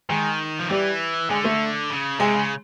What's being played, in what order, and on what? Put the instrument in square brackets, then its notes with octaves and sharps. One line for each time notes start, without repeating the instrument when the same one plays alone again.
[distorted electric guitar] D#3 [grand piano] G#3 G#4
[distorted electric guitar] F3
[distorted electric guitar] E3 [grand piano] G3 G4
[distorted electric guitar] D3 [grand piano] G#3 G#4
[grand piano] A3 A4
[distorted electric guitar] C#3
[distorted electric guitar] C3 [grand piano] G#3 G#4
[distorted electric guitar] C#3